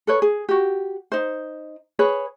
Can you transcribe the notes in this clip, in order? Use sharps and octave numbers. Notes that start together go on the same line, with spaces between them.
A4 B4 C#5
G#4
F#4 G4
D#4 C5
G#4 B4 C#5